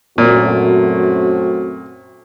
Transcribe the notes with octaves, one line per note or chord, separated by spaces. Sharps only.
F#2 A#2 A3 C4 F#4